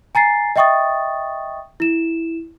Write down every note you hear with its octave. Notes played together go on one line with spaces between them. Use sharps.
G#5 A#5 A6 C7
D#5 E5 G5 C#6 D#6 A6
E4 E7